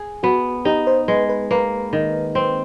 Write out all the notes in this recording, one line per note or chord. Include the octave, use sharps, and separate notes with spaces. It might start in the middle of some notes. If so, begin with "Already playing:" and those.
Already playing: G#4
B3 F#4
D#4 G4
C5
G#3 B4
B4
A#3 B4
D#3
C4